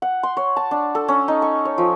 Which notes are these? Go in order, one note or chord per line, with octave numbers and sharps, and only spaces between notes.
F#5
C6
C#5
A5
D4
A4
C#4
D#4
C#6
C#5
F3